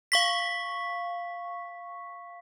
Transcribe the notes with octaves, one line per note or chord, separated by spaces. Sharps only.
F5 C#6 B6